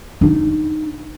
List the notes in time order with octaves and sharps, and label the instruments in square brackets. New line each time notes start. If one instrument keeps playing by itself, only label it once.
[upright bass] D4 D#4